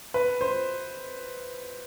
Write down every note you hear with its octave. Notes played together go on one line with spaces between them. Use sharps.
B4
C5